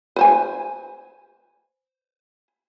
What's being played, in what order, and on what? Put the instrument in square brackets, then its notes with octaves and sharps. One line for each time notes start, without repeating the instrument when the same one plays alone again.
[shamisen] B4 C5 G#5